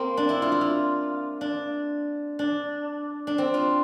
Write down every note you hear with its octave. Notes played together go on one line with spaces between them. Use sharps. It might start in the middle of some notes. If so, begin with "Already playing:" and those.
Already playing: A#3 C4
D4
E4
F4
E4
F4
D4
D4
D4
C4
F4